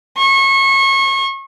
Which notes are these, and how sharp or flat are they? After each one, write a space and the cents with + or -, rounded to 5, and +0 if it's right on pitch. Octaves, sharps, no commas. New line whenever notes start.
C#6 -30